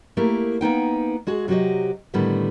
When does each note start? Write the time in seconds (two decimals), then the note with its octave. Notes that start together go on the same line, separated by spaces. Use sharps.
0.17 A3 A#3 E4 G4 A#4
0.61 A#3 B3 D#4 G5
1.27 G#3 F#4 G#4
1.48 C3 F#3 F#4 G4 D#5
2.14 A2 D3 D#3 G3 B3